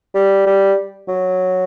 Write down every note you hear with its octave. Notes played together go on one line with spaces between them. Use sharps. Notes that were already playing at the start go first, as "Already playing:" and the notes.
G3
G3
F#3